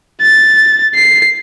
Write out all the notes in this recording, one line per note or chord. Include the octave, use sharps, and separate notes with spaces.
A6
C7